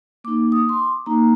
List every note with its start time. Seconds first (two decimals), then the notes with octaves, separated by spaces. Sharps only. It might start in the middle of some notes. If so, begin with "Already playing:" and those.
0.24 A#3 D#4 D6
0.52 D#6
0.69 C6
0.79 D6
1.06 A#3 D#4 A#5